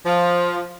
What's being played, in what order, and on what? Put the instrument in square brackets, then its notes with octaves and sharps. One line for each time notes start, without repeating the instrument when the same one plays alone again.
[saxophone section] F3